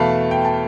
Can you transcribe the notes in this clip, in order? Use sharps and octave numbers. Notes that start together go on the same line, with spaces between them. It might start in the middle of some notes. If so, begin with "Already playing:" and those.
Already playing: E2 B2 A3 F5 A5 B5
G5
A5